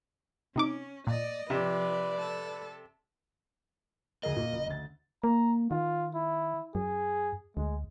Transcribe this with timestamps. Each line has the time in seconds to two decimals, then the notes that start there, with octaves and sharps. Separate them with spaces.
0.56 C3 C#4 D#4 D6
1.07 A#2 D5 D#5
1.50 C3 F3 B4 D5
2.17 A4
4.23 D2 G#4 A#4 D#5
4.36 A#2
4.53 F#1
4.66 D2 A6
5.24 A#3 A#5
5.71 D#3 F4
6.14 E4
6.75 F#2 G#4
7.57 D2 G#3